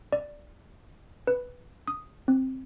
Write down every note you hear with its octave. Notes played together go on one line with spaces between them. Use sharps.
D5
B4
D#6
C4